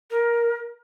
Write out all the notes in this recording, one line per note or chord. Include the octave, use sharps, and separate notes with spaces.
A#4